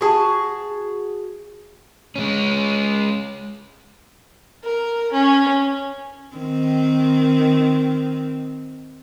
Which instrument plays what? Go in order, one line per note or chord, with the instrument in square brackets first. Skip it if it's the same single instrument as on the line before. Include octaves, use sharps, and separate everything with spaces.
[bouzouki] F#4 G#4 A5
[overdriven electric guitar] G#3 C#4
[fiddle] A#4
C#4
[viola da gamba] D#3 C4